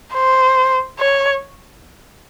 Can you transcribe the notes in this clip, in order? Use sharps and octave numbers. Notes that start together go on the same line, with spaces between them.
C5
C#5